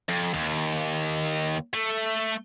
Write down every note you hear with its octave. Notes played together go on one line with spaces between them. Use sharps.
F2
D#2
A3